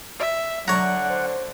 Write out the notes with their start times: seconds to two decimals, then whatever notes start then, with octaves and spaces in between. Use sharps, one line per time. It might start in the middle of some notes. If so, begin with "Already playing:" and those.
0.19 E5
0.68 D3 F#3 C#5 F#5 A#5
1.10 C5